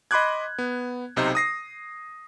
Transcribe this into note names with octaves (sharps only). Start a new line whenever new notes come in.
D#5 B5 C6 D6 F#6 G#6
B3
B1 C3 D#4 C5
D#6 A#6 C7